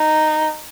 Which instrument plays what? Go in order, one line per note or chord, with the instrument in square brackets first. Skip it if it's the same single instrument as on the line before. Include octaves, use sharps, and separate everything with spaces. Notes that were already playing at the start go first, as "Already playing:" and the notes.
Already playing: [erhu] D#4